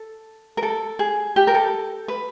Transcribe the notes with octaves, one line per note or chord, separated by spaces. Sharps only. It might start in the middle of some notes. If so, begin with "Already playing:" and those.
Already playing: A4
A#4
A4
G#4
G4
A#4
A4
B4